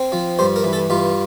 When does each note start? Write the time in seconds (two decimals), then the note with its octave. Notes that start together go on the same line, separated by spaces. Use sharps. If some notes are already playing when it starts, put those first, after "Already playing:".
Already playing: C4
0.12 F3
0.39 G2 C5
0.56 A#4
0.64 E3
0.73 A4
0.90 G2 F4